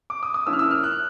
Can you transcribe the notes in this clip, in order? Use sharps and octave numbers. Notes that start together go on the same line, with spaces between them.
D6
D#6
D#6
F3 A#3 C#4 E4 E6
F6
E6
F6
F#6